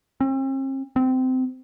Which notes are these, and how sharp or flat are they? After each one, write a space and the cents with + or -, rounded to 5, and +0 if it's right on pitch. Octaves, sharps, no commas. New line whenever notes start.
C4 +45
C4 -20